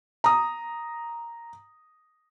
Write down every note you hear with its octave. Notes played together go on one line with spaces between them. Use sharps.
A#5 D#6